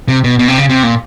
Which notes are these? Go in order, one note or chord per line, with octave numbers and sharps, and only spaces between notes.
C3
B2
B2
C3
C#3
C3
A#2